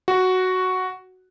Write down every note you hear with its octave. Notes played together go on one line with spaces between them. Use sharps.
F#4